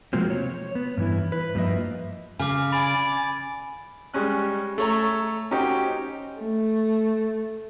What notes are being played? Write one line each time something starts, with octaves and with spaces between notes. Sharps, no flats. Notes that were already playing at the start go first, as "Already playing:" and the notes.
C3 F3 F#3 G#3 A#3 C4
C#5
B3
G2 E3 E4
B4
G2 F3 A#3 C4 D#5 E5
C#3 G#5 D6
D5 G#5 B5
G3 G#3 C#4 F#6
A3 C#5 A#5
C#4 D#4 F#4 G4 C5 G5
A3